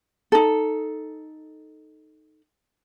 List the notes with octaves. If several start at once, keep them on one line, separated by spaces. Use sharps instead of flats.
D#4 A4